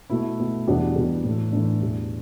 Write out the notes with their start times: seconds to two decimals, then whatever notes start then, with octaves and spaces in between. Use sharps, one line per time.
0.10 B2 A3 E4
0.39 B2 A3
0.68 E2 B2 G3 D4
0.96 E2 B2 G3
1.24 A2 E3 A3
1.52 A2 E3 A3 D4
1.81 E2 B2 G3